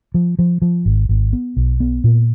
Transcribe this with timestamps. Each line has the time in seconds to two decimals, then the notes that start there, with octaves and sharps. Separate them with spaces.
0.14 F3
0.39 F3
0.62 F3
0.86 G#1
1.09 G#1
1.33 B3
1.56 B1
1.80 B3
2.04 A#2